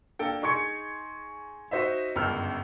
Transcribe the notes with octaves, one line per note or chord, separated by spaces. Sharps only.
A#3 D4 A4 G5
D#4 G#4 C6 C#6 G#6 C#7
D#4 F#4 C5 D#5 E5
G1 C#2 F#2 E6 F6